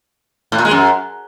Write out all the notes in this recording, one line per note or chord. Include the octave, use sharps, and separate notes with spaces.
A2
A#2
G#3
F#2